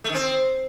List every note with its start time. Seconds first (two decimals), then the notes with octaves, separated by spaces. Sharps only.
0.04 A3
0.10 D#3
0.15 C4